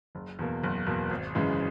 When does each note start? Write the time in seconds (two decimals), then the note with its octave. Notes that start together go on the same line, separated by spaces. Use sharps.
0.15 F#1
0.39 E2 B2 A#3
0.63 F#1
0.86 E2 B2 A#3
1.11 G#1
1.35 F#2 C#3 E3 G#3